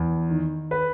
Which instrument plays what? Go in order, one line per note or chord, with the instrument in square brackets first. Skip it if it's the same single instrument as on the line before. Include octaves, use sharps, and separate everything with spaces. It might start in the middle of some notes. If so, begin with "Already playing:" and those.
Already playing: [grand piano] E2
D#3
B4